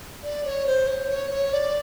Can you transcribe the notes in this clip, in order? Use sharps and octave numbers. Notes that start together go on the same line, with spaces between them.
D5
C#5
C5
C#5
C#5
C#5
D5